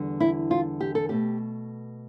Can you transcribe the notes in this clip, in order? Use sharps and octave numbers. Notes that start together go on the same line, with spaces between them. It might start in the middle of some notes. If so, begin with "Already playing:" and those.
Already playing: E2 D3 G3
E4
F4
G4
A4
B2 A3 G4